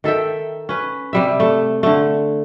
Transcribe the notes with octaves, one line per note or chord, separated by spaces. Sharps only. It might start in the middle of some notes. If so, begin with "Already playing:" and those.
D#3 A4 E5 G5
C#4 B4
C3 G3 E5
A3
D3 A3